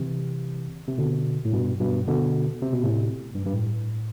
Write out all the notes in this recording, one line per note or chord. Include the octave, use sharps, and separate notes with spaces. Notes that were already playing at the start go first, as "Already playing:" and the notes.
Already playing: C3 E3
C3
B2 D3
A2
G2 B2
G2 B2
B2 D3
C3
B2
A2 C3
G2
G2
A2